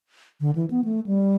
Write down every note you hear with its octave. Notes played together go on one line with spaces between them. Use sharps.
D3
E3
B3
A3
G3